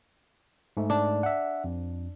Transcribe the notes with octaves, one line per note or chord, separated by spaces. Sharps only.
G#2 A3
D4
E5 F#5
F2